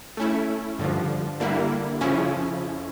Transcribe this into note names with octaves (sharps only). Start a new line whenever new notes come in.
A3 C#4 E4
G2 D3 F3
D3 G3 A#3 E4
F2 C#3 F3 C#4 E4